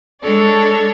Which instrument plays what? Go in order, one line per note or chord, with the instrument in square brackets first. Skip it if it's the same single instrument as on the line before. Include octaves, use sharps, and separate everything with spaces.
[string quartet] G#3 D4 A4 C#5 D5